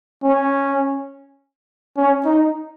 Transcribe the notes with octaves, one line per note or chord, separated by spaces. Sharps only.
C#4
C#4
D#4